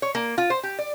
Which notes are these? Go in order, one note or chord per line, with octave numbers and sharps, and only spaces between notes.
C#5
A#3
F4
C5
G4
D5